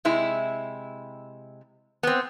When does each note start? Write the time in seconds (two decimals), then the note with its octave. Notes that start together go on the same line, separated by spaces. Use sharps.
0.05 C3 G#3 E4
2.03 B3 C4